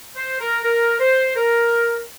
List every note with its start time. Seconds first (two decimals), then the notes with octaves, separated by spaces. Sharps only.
0.16 C5
0.40 A#4
0.63 A#4
1.00 C5
1.36 A#4